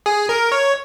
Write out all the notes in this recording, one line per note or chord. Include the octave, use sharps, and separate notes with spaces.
G#4
A#4
C#5